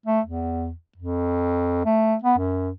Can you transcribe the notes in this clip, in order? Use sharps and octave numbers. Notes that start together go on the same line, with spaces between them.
A3
E2
F2
A3
B3
F#2